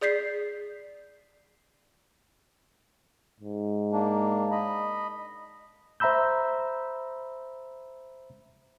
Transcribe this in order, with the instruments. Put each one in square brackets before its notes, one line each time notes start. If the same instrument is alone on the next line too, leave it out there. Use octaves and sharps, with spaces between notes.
[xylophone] G#4 D5 G6 B6 C7
[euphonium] G#2
[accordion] A#3 D4
D#5 B5
[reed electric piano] C5 E5 A#5 B5 E6 G6